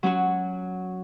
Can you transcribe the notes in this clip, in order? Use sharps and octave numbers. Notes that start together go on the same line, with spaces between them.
F#3 C#4 F#4